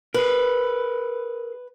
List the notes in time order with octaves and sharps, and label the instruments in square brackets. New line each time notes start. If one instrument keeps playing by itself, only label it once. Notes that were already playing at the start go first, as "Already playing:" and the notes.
[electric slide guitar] G#4 A#4 [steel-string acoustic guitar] B4